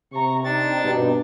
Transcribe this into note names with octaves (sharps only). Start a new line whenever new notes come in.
C3 A#5 C#6
C4 D4 D#4 A6
G2 B2